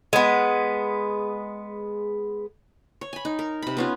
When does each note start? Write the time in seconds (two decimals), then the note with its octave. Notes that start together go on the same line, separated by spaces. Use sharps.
0.13 G#3 B3
3.01 C#5
3.13 G#5 B5
3.25 D#4
3.39 A#4
3.62 C3 B5
3.77 B3 C#4 F4